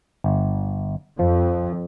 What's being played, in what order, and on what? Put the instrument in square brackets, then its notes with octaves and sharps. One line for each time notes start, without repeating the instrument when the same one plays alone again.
[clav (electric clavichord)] G1
[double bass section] F2 [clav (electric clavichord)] F3